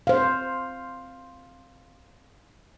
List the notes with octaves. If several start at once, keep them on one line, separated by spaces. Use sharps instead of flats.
C5 F5